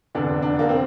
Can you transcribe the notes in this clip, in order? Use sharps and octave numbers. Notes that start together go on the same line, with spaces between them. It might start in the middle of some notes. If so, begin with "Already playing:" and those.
F1 E2 D3 D4
D4
A#3
C4